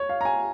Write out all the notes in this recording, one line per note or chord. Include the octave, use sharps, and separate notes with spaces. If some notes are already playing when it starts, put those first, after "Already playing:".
Already playing: C#5
F5
A#5
G#5